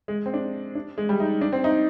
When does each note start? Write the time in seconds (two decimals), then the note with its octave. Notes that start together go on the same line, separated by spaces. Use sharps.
0.08 G#3
0.26 C4
0.34 D4
0.75 D4
0.98 G#3
1.09 G3
1.20 D#4
1.41 D4
1.53 C4
1.64 D#4